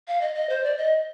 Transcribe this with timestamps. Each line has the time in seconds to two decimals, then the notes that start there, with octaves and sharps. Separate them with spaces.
0.08 F5
0.21 D#5
0.35 D#5
0.49 C5
0.64 D5
0.78 D#5